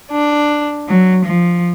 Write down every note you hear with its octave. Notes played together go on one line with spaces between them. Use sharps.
D4
F#3
F3